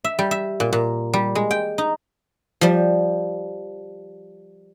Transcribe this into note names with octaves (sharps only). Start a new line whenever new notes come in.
E5
G3
E5
A#2
A#2
G3
G#3
G5
D#4
F3 G3